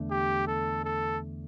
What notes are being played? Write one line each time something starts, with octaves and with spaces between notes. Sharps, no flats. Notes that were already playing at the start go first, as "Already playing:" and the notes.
Already playing: E2 D3 A3
G4
A4
A4